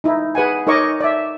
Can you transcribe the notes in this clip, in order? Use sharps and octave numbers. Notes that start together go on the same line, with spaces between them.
D#4 E4
G#4 B4 F#5 G#5
D#4 A#4 C#5 D#5 C#6 D6
D5 E5